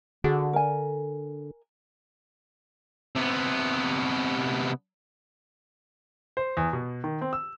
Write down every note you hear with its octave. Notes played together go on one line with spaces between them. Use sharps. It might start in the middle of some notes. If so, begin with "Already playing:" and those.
D3 F#4 G#4
A#4 G#5
C3 B3
C5
E2
B2
D#3
C4
E6